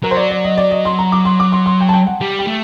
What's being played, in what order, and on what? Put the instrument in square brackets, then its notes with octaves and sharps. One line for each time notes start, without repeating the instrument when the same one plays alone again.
[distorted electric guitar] F#3 [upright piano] A#4
[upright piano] C5
D5
D5
D#5
D5
D#5
C6
A#5
D6
C6
D6
C6
C6
G5
A5
G5
F#5
[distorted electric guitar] G3
[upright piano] G5
[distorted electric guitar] A3